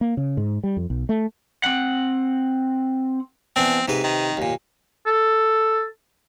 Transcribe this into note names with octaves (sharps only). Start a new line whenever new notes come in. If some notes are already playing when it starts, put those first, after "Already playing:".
A#3
C#3
G#2
G3
F2
B1
A3
C4 F#5
E3 B3 C4 D4
G#2 C3 B4
D#3
D#2 A#2
A4